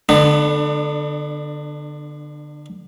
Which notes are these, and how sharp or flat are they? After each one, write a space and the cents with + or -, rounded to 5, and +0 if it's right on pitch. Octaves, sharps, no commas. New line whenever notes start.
D3 +0 B3 +0 D4 +35